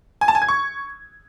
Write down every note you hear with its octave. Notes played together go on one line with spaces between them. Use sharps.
G#5
A5
G#5
G#6
C#6